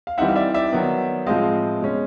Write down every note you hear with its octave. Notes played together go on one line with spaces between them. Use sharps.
F5
E3 G3 C4 D#4 E5 F#5
F5
D5 E5
D5 E5
D#3 F#3 B3 D#4
A2 F3 G#3 C4 D#5 F5
B2 G#3 C#4